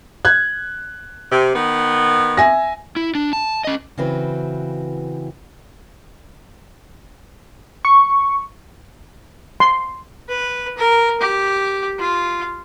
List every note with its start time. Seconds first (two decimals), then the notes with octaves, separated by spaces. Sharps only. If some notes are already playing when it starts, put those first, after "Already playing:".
0.25 F#6 G#6
1.32 C3
1.55 D#3 B3
2.37 E5 G#5 A#6
2.96 E4
3.15 D4
3.33 A5
3.65 C#4 D#5
3.98 C#3 E3 C4 F#4 B4
7.85 C#6
9.60 C6
10.29 B4
10.78 A#4
11.21 G4
11.99 F4